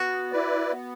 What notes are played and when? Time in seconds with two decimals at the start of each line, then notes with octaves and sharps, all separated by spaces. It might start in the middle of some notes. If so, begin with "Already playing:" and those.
Already playing: B3 F#4
0.32 E4 B4 D5
0.72 B3